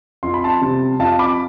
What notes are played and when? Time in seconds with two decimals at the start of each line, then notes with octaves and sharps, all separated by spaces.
0.23 F2 C6
0.34 B5
0.44 A5 C6
0.62 C3 G3
0.99 F2 F5 A5
1.19 B5 D6